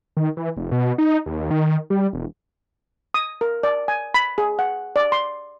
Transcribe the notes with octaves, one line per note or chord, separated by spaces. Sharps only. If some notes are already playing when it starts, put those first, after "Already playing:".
D#3
E3
F1
B2
D#4
D#2
D#3
G3
E1
D#6
A#4
D5
G#5
B5
G#4
F#5
D5
C6